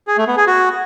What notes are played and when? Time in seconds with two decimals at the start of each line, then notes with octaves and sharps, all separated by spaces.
0.07 G#4
0.17 A3
0.27 B3
0.37 G#4
0.47 F#4